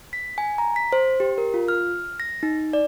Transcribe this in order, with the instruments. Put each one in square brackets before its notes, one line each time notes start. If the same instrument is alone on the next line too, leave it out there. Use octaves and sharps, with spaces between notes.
[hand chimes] B6
G#5
A#5
B6
C5
G4
A#4
F4
F6
A#6
D#4
D5